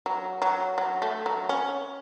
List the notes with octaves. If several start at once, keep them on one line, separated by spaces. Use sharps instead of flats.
F#3
F#3
F#3
A3
F#3
C#4